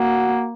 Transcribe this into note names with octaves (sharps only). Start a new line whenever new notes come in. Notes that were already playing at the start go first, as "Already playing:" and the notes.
Already playing: A#3 F#4